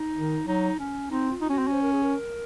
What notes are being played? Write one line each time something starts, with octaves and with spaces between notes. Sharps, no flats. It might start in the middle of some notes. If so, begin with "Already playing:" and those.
Already playing: D#4
D#3
F#3 D#4
C#4
C4 D#4
F4
D#4
C#4 F#4
C4
C#4
C5
A#4
G#4
A#4